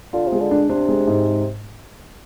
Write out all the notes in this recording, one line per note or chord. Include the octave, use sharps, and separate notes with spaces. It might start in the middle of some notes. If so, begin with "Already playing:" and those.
D3 F4
C3
G#3
D3
D4
C3 D4
G#3
G#2